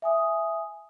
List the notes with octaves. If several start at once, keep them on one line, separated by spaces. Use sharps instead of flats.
E5 G#5 D#6